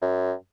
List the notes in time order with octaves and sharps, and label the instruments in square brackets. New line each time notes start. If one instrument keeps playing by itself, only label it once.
[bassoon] F#2